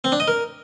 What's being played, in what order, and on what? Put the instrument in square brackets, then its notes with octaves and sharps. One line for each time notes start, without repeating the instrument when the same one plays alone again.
[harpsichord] C4
D4
D#5
A#4